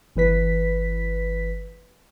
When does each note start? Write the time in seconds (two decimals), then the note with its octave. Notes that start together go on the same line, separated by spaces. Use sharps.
0.16 G1 E3 B4 B6